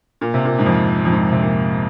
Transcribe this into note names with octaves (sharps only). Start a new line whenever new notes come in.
A#2
C3
A#2
G#2
F2
F2
G#2
C3
A#2